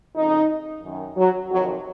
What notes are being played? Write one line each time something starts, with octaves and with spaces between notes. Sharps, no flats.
F2 C#3 D#4
F#2 D#3
F#3
F2 C3 D#3 F#3